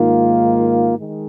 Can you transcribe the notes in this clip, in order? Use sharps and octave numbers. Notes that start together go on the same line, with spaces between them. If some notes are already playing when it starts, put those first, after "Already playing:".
Already playing: G#2 D#3 A#3 F4
D#3 G#3